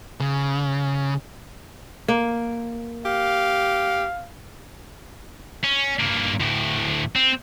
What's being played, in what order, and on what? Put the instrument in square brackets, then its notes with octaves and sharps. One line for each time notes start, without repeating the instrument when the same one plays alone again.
[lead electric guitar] C#3
[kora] A#3
[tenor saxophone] G4 [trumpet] F5
[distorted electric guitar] C#4
G2 A#3
D2 A2
C4